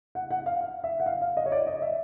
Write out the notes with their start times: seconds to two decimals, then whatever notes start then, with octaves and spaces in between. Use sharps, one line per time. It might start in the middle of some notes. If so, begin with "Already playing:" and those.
0.15 F#5
0.31 F#5
0.46 F5
0.61 F5
0.84 E5
1.00 F#5
1.06 F5
1.22 F5
1.37 D#5
1.46 C#5
1.52 D5
1.67 D#5
1.82 E5